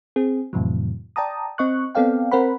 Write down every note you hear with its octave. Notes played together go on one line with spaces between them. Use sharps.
C4 G#4
F2 A2 C3 E3 F#3
D5 G5 A5 A#5 D#6
C4 D#5 C#6 F#6
B3 C4 A4 D5 F5 G5
C4 A#4 C5 F#5 B5